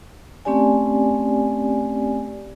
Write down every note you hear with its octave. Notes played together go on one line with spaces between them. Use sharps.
A3 C4 C#4 G4 D5 G#5